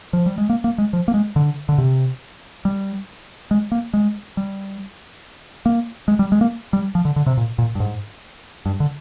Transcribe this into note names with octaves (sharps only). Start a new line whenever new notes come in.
F3
G3
G#3
A#3
A#3
G#3
F3
A#3
G#3
D3
D3
C3
G3
G#3
A#3
G#3
G3
A#3
G#3
G3
G#3
A#3
G3
F3
D3
D3
C3
A#2
A#2
G2
G#2
G2
D3